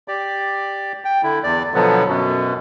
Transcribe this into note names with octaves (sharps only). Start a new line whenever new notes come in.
G4 D5
G5
D3 E4
E2 D5
B2 D3 F3 F#3 B3
F#2 B2